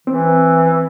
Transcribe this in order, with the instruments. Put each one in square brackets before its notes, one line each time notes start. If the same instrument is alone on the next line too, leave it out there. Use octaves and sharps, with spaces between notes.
[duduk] E3 [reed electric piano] C4